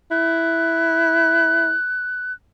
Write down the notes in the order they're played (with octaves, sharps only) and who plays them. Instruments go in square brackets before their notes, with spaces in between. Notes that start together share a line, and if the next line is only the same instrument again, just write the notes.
[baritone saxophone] E4 [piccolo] F#6